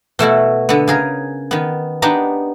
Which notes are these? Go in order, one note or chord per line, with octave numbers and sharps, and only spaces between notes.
B2 A3 E4 F#4
D3 B3
C#3 G#4 A#4
D#3 B3
B3 D4 D#4 G4 A#5